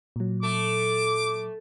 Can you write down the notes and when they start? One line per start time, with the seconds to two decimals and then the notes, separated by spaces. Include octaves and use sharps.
0.16 A#2 F#3
0.43 A3 D6